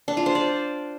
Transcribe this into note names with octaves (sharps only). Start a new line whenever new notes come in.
D4
F4
C5
D5